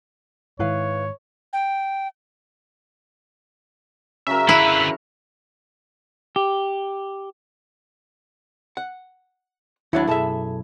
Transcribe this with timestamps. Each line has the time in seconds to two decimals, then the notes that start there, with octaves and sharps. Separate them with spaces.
0.59 G#2 D#3 E4 B4 C#5 F5
1.53 G5
4.27 C#3 F#3 A#4 E5
4.49 D3 E4 B4
6.36 G4
8.77 F#5
9.93 D#2 F#3 D4 E4 C#5 F#5
10.07 B1 F#2 G#4 A4 E5 A5